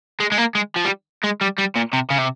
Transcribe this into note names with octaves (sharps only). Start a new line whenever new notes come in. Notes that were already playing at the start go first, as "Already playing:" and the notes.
G#3
G#3
A#3
G#3
F3
G3
G#3
G3
G3
A#2
C3
C#3
C3